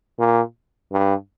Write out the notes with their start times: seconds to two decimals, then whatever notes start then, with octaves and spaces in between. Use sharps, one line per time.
0.19 A#2
0.92 G2